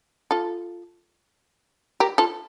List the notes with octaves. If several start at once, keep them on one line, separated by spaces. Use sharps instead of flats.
F4 A4
G4 A#4
F4 A4